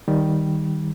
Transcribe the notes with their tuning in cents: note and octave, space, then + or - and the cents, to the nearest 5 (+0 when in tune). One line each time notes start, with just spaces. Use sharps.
D#3 +0 G3 -5